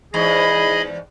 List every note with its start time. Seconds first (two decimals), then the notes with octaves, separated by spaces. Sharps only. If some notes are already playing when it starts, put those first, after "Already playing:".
0.14 E2 G#2 G#4 D#5 B5